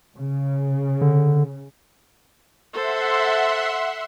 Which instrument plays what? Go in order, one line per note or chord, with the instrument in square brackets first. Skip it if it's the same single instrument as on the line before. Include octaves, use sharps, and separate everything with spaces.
[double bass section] C#3
[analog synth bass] D3
[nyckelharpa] A4 C5 [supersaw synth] E5 F#5 C6